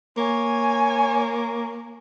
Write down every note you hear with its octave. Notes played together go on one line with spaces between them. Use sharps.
A#3 C#5 G#5